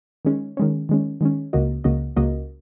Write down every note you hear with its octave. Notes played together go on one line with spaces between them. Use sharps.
D#3 G#3 C#4
D#3 G#3 C#4
D#3 G#3 C#4
D#3 G#3 C#4
C#2 C#3 A#3 F#4 D#5
C#2 C#3 A#3 F#4 D#5
C#2 C#3 A#3 F#4 D#5